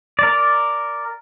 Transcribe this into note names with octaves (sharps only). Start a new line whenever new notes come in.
A#4 D5